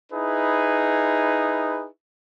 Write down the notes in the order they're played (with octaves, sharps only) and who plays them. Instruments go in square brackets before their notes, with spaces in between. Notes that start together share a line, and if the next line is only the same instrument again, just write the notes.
[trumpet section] D#4 E4 G#4 B4